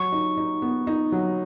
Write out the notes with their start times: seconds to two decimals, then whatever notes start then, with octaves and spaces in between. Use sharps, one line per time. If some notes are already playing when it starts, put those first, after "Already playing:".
Already playing: F#3 C#6
0.12 D#4
0.37 D#4
0.62 B3
0.87 D#4
1.12 F#3